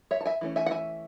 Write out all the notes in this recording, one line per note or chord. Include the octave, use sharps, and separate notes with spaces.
C#5 E5
A5
E5 G#5
E3 A3 C#4
E5 G#5
F#5
E5 G#5